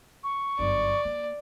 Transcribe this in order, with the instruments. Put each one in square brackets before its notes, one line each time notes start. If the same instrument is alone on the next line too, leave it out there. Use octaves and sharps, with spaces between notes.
[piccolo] C#6
[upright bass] G1 F#2 [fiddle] D5
[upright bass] A#3